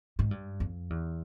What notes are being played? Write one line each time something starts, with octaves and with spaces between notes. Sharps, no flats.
G#2
G2
F2
E2